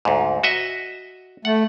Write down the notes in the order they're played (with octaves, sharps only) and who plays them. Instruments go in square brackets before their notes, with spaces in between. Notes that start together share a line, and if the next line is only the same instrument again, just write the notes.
[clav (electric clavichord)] D2 G#2
F#4 D#5 E5
[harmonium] A3 [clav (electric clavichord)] F#5